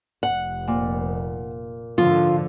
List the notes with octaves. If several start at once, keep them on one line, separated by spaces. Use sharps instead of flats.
F1 F#5
A#2
G#2 D3 F3 F4